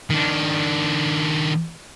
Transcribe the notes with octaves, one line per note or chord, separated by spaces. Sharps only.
D#3 D4